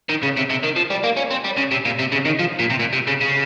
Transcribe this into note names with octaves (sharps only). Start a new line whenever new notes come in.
D#3
C#3
C3
C3
D#3
F3
G3
A#3
C#4
C4
G3
C#3
C3
A#2
C3
C#3
D#3
F3
A#2
C3
A#2
C3
C#3
C#3